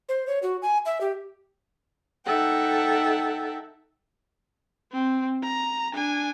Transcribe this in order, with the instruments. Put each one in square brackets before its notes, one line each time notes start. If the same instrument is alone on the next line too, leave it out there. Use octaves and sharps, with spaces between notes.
[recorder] C5
C#5
F#4
G#5
E5
G4
[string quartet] D#4 A4 E5 F#5 G5
[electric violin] C4
A#5
D4 G#5